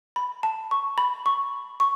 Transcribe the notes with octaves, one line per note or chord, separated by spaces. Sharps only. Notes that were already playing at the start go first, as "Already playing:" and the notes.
B5
A5
C#6
B5
C#6
C#6